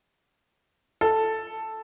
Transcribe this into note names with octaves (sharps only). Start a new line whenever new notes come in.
A4